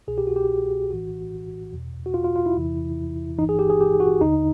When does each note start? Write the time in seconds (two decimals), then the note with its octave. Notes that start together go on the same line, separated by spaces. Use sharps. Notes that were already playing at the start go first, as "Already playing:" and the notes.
0.07 C2 B2 G#4
0.18 G4
0.27 F#4
0.36 G4
0.90 A#1 A2 E3 F#4
1.73 E2 B2
2.06 F#4
2.14 F4
2.24 F4
2.36 F4
2.46 E4
2.56 E2 C3 E3
3.38 G1 G2 E3 D#4
3.49 G#4
3.59 G4
3.70 G#4
3.81 G4
4.00 F#4
4.21 D#2 D3 D#4